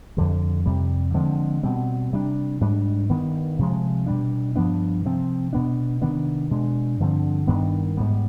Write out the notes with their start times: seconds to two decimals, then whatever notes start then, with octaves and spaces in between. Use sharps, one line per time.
0.17 F2 D3 G3
0.66 F2 C3 G3
1.14 D3 F3 G#3 C4
1.63 B2 G3 C4
2.13 C3 G3 D4
2.61 G#2 G3 D4
3.10 G2 D#3 B3
3.59 C3 F3 G#3
4.06 B2 G3 D4
4.56 G2 F3 B3 D4
5.05 C3 F3 C4
5.53 B2 B3 D4
6.02 C3 D#3 B3 D4
6.51 B2 G#3 D4
7.00 G2 D3 F3 C4
7.47 G2 D#3 B3 D4
7.97 G#2 G3 B3